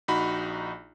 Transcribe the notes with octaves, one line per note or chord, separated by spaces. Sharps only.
A#1 D#4 F#4 B5